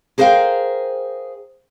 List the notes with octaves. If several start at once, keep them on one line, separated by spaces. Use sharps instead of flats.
G#4 A#4 C5 D#5 F5 G5